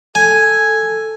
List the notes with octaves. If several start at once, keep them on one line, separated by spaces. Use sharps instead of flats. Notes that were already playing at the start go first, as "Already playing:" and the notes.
A4 G#5